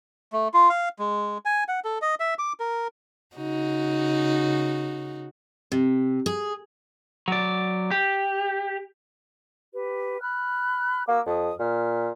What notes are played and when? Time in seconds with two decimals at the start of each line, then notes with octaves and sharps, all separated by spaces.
0.32 A3
0.54 F4
0.70 F5
0.99 G#3
1.45 G#5
1.68 F#5
1.85 A4
2.02 D#5
2.20 E5
2.39 D6
2.60 A#4
3.36 C#3 D#4 F#4
5.72 C3
6.26 G#4
7.28 F#3 D5
7.91 G4
9.73 G4 B4
10.21 B5 F6 F#6
11.08 A#3 F#4 D6 E6
11.26 F2 D#6
11.60 A#2 F6